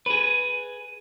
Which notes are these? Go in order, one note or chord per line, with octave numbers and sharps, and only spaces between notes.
G#4 B4